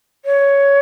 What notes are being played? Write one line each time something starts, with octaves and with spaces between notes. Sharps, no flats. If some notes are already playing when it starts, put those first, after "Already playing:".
C#5